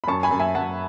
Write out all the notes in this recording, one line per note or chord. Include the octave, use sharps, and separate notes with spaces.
B5
F#2 A5 C#6
G#5 B5
F#2
E5 G#5
F#2 F#5 A5